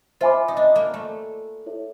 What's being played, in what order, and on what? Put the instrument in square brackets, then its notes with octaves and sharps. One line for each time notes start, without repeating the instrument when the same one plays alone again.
[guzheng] F4 [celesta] C5 E5 G#5 B5 D6
[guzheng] D#4
D4
A#3
A3
[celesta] E4 A4 C#5 E5